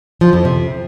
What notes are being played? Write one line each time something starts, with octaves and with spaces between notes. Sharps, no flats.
F3
F2
C3